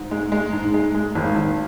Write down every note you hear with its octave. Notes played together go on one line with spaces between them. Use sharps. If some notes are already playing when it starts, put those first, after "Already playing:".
Already playing: G#2
G#3
G#3
G#2
G#3
G#3
G#1
G#1